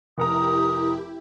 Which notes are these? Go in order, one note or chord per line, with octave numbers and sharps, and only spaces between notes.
F1 E4 G4 A#4 A#5 D#6